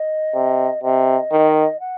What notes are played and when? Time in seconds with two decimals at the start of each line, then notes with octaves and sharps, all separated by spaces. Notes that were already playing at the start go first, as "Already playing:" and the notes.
Already playing: D#5
0.35 C3
0.83 C3 D#5
1.32 D#3
1.80 F#5